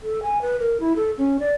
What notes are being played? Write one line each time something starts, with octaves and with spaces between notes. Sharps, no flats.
A4
G#5
B4
A#4
E4
A4
C#4
D5